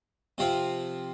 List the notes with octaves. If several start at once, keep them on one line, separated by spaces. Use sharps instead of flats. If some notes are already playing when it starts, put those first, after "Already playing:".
C3 F3 C4 F4